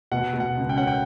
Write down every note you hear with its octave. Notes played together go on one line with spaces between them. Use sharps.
B2 F#5
B2
F#5
C#2
G5
C#4 F#5
G5